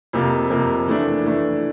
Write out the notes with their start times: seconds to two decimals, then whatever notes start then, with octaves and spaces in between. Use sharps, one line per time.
0.13 F2 C3 F3 A#3
0.50 F2 C3 F3 A#3
0.87 E3 A3 D4
1.24 E3 A3 D4